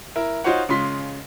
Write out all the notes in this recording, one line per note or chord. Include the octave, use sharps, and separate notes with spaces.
E4 A#4
D#4 F4 F#4 C5 C#5 F#5
C#3 G#3 F4 C6 B6